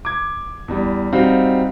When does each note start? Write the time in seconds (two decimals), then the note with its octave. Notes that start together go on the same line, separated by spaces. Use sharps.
0.05 D6 G#6
0.68 E2 G3
1.13 G3 C4 D#4 F#4 F5